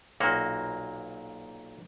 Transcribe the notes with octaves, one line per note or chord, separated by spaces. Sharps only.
B1 A#2 A#3 F#4